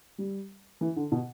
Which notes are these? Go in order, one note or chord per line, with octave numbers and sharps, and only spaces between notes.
G3
E3
D3
B2